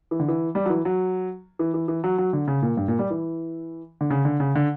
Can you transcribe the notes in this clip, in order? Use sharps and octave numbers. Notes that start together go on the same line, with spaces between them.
E3
D3
E3
G3
F#3
E3
F#3
E3
E3
E3
F#3
F#3
D3
C#3
A#2
G2
A#2
G3
E3
D3
C#3
D3
C#3
D3